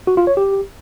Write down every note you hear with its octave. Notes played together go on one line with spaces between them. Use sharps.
F#4
F4
C#5
G4